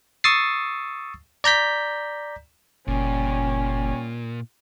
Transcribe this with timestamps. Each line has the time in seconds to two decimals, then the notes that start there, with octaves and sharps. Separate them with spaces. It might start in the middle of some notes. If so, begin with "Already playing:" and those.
0.24 C#6 D#6 E6 A6 C7
1.44 D5 A#5 G6 B6
2.87 F#1 A#2 G3 C#4